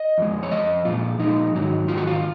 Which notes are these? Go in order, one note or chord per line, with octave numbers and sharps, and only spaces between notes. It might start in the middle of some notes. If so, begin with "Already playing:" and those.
Already playing: D#5
F2 F3 G#3
C#5
F2 F3 D#5
A#2 F3 G#3 F4
A#2 F3 G#3 D#4
G#2 D#3 F#3
G#2 D#3 F#3 F4
F#4
F4